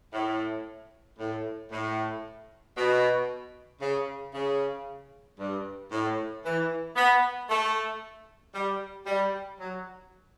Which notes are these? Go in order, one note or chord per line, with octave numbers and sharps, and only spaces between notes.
A2
A2
A2
B2
C#3
C#3
G2
A2
E3
B3
A3
G3
G3
F#3